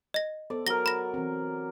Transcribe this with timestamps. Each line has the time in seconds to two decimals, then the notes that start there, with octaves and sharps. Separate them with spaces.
0.14 D#5 A#6
0.50 B3 A4 C5 D5
0.67 F#3 A#4 A#6 G7
0.86 B5 A#6
1.14 E3 C4